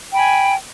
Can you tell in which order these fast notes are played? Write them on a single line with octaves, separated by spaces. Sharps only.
G5 B5 G#5